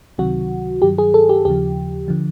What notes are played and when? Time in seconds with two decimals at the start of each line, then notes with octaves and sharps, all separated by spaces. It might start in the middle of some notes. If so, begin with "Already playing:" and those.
0.18 C#2 C3 D#3 F#3 F#4
0.82 G2 D#3 F#3 G4
0.98 G#4
1.14 A4
1.29 G4
1.45 D#2 C#3 F3 G4
2.08 D3 F3